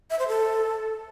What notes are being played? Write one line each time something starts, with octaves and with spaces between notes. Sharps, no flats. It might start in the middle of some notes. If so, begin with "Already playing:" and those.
E5
C5
A4